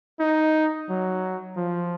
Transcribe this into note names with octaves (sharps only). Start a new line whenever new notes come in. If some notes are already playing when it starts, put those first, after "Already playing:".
D#4
F#3
F3